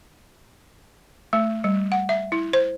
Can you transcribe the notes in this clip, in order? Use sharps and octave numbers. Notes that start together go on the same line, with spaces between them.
A3
G3
F#5
E5
E4
C5